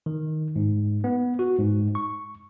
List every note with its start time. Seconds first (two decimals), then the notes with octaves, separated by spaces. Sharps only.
0.06 D#3
0.56 G#2
1.04 B3
1.39 F#4
1.59 G#2
1.95 C#6